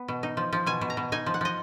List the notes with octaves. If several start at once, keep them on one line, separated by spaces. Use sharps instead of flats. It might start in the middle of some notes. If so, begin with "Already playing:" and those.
Already playing: B3
B2
D#4
F3
F3
B2 G#5
B2
A#5
B2
D#4 G#5
F3
F#5
F3 D#5